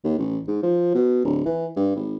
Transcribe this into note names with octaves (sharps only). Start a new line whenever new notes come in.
D#2
A1
G#2
F3
B2
D1
E3
G2
G#1